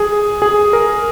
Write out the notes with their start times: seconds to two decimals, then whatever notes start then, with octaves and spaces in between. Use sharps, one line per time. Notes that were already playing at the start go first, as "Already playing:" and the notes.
Already playing: G#4
0.42 G#4
0.73 A#4